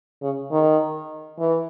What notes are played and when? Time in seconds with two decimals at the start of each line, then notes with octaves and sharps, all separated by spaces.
0.22 C#3
0.51 D#3
1.39 E3